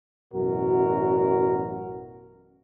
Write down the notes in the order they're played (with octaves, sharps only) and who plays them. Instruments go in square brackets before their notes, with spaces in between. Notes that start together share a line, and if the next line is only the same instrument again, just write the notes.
[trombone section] A1 F#2 B2 F#4 A#4